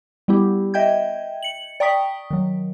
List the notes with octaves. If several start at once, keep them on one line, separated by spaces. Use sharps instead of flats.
G3 B3 E4 G4
D#5 E5 G5 G6 G#6
C#7 F#7
D5 G5 A#5 C#6 D#6 B6
D#3 F#3